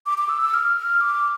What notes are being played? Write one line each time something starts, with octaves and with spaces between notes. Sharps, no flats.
D6
D6
E6
E6
F6
F6
D6